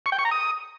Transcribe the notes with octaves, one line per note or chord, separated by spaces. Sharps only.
C#6
G5
C#6
A#5
D#6